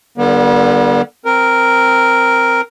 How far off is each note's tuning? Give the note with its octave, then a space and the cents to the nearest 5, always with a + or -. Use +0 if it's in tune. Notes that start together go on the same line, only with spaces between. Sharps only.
D3 +10 G3 -25 B3 -40
C4 +0 A#4 +0